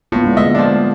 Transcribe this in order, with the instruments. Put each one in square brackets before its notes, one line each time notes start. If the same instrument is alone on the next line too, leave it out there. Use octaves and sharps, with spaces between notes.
[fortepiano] A2 [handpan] A#3 B3 F4
[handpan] G#3 D4
[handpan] D3 A3 [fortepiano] D#5 E5
[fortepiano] F3 D4